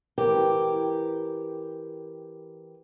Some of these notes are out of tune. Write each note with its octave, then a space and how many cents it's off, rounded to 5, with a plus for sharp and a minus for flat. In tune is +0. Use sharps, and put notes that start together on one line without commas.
E3 +0 G4 +0 A#4 +0